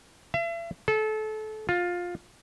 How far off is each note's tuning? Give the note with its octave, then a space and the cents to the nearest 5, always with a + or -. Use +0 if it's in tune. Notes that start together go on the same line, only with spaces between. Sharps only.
E5 +40
A4 -25
F4 +15